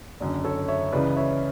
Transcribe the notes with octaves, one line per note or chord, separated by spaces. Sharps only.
F#1 F#2 D3
A4 C#5
C#5 E5
C#2 C#3 E3 B4 D5
C#5 E5